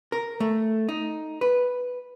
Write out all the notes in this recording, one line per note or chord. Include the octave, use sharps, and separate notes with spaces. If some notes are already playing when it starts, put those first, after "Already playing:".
A#4
A3
D#4
B4